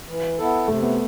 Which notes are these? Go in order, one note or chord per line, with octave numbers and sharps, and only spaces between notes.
E3
B3 E4 A4
C3 A3
B3